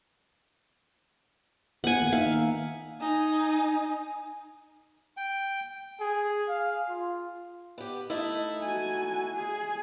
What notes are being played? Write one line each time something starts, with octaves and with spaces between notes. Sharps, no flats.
B3 F#5 G#5
D#3 A#3
A#3 D#4 E5 F5
D#4 G#5
G5
G#4
F5
F4
B3 G4
A3 D#4 E4
F#4 G#5
G#4